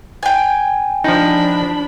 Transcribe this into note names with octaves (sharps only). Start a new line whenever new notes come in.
G5 G#5
F3 D4 D#4 B5